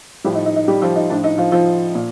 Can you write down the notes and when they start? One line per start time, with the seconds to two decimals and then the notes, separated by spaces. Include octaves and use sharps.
0.24 A2 F3 G3 G4
0.35 D#4
0.46 D#4
0.56 D#4
0.68 G3 G4
0.82 F3 F4
0.96 D#4
1.10 A2 F3 D4
1.24 D#4
1.38 F3 F4
1.52 F3 F4
1.95 A#2